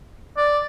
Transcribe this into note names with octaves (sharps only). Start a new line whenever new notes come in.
D5